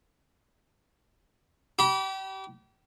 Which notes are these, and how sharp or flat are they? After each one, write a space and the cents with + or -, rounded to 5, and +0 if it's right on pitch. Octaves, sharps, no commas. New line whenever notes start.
G4 -35 B5 -30